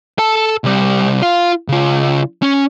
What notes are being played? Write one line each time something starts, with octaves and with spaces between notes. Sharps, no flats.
A4 A5
C2 G3
F4 F5
C#3 F4
C#4